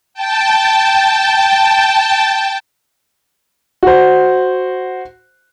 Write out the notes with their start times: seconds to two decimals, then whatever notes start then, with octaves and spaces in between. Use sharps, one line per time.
0.14 G5 A5
3.83 F#4 C5